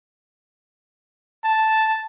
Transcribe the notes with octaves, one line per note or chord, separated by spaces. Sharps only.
A5